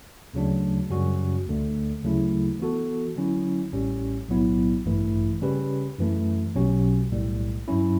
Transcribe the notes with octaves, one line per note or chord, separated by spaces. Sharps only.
D2 C#3 F#3 A3 D4
F#2 C#3 G3 C#4 F#4
D2 D3 A3
D2 C#3 F#3 A3 E4
E3 B3 F#4 A4
D3 F#3 C#4 E4
A1 A2 G3 C#4 G4
B1 A2 F#3 B3 E4
A1 G2 E3 A3 E4
C#3 G3 C#4 G4 B4
F#2 E3 A3
B1 B2 F#3 C#4 G4
B1 A2 G3
G2 F#3 C#4 E4